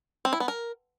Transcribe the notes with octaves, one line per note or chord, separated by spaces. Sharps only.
C4
E4
B3
A#4